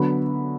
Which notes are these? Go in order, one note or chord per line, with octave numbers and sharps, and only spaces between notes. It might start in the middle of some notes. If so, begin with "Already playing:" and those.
Already playing: D3 F#3 B3 B5